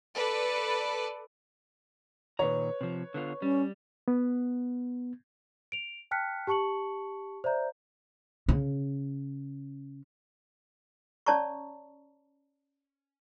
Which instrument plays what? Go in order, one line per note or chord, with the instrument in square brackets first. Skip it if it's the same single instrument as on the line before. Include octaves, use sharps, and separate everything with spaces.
[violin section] A4 B4 D5
[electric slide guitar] A#2 D#3 A#5 [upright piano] B4 C#5
[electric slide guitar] C3 F3
D3 B3 F4
[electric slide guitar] G3 [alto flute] C#4
[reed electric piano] B3
[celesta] D7 F7
G5 A5 F6 F#6 B6 C#7
G4 A5 C#6 C#7 F#7
C5 D5 E5 A#5 G6
[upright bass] C#3 C#4
[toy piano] C#4 C#5 D5 A5 A#5 C#6